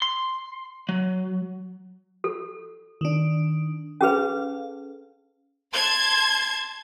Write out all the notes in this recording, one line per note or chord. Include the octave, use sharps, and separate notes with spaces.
C6
F#3
A4
D#3 D4
C#4 G#4 A4 B4 F5
A5 C6 G#6